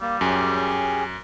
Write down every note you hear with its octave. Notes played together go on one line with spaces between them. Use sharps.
G3 A#3
F#2 C#4 G4 G#4